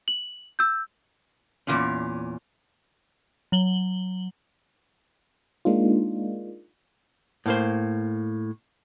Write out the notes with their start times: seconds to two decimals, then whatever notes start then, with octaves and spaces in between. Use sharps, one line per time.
0.08 F#7
0.59 E6 G6
1.67 E2 A#2 C#4
3.52 F#3 F#7 G7
5.65 G#3 A#3 D4 D#4 F4
7.46 A2 A#3 C5